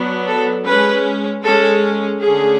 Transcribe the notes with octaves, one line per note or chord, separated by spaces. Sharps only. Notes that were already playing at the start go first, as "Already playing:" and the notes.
Already playing: F#3 B3 D4
A4
G#3 C#4 B4
G#3 C#4 A4
D3 A3 C#4 G#4